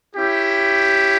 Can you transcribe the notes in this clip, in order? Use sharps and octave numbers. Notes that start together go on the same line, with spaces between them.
C#4 E4 G4